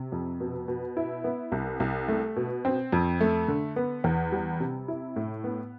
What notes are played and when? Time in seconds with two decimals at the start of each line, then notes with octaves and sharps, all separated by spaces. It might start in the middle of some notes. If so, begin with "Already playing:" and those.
Already playing: C3
0.12 F2
0.40 B2
0.68 B2
0.97 E4
1.24 B3
1.52 C2
1.80 C2
2.08 A3
2.36 B2
2.65 C4
2.92 F2
3.20 A3
3.48 D3
3.76 B3
4.04 E2
4.32 G3
4.60 C3
4.88 E4
5.16 A2
5.44 B3